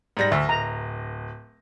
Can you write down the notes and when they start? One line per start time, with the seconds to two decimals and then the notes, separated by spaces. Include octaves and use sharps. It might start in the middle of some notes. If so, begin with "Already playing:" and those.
0.17 G#2 G3 A#6
0.32 D2 E5
0.49 D1 A#5